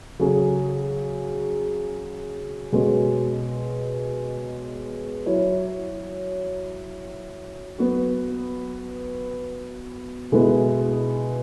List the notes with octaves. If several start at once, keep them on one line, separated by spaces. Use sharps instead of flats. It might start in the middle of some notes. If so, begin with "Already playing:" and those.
C#3 F#3 C#4 G#4
B2 G#3 C#4 F#4
F#3 E4 C#5
F#3 B3 F#4
B2 G#3 B3 E4 G#4